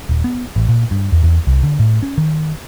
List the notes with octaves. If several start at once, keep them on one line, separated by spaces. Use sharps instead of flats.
D#1
B3
A1
A#2
G2
E2
E2
C2
D3
A2
C#4
D#3